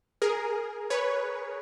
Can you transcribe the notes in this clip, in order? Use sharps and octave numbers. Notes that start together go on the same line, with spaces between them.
G#4 A#4
B4 C#5